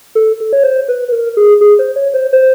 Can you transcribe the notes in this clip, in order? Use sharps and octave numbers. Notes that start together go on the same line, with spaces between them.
A4
A4
C#5
C5
B4
B4
A#4
G#4
G#4
C5
C#5
C5
C5